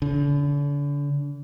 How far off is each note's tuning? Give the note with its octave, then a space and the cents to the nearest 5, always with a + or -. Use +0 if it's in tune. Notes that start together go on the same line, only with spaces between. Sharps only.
D3 -35